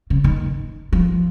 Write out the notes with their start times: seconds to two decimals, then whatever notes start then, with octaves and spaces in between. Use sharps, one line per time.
0.10 C#3
0.24 D#3
0.93 F3